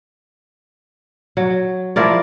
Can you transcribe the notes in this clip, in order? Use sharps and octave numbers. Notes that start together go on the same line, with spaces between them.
F#3
F3 E4 A#4 D5